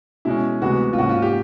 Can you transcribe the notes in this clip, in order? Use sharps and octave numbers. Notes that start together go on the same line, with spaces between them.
B2 G#3 C#4 E4
D2 C3 E3 G#3 B3 F#4
F4
G#2 D#3 F#3 A#3 C#4 F#4
F4
G4